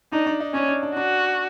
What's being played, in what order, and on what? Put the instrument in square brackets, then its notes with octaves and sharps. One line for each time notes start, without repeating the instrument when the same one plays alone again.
[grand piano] D4 [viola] D#4
[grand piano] D4
D#4
[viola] C#4 [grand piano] D4
[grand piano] D4
D4
[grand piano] D4 [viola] F#4